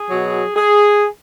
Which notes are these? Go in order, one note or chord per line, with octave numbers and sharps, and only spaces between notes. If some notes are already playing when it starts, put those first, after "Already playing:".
Already playing: G#4
B2 F#3
G#4